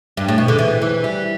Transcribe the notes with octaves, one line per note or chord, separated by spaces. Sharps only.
G2
A2
B2
D3
E3
E3
G3